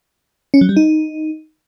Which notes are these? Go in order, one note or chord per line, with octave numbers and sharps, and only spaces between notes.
C#4
F#3
G3
D#4